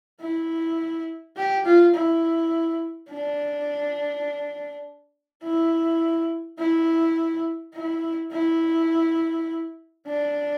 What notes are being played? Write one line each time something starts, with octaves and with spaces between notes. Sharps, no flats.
E4
G4
F4
E4
D4
E4
E4
E4
E4
D4